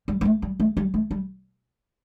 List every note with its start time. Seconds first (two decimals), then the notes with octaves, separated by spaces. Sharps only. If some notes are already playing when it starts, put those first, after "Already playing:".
0.08 G3
0.21 G3
0.25 A3
0.42 G3
0.60 A3
0.77 G3
0.94 A3
1.11 G3